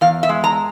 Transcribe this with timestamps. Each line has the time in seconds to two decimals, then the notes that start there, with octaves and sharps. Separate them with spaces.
0.01 E2 F5
0.23 E5
0.29 G#3
0.44 A#5